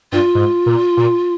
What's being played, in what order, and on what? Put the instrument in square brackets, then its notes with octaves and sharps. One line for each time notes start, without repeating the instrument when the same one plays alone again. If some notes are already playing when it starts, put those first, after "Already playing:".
[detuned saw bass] G2 [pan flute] F4
[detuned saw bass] G#2
A#2
A#2